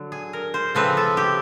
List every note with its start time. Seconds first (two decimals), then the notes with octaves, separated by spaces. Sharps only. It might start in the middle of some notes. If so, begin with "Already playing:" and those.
Already playing: D3 F#3
0.12 G#4
0.33 A#4
0.54 C5
0.75 C#3 F3 A3 C4 B4
0.97 A4
1.17 G4